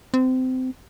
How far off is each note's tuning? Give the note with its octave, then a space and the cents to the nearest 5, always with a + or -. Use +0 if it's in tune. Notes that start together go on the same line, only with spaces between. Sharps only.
C4 -25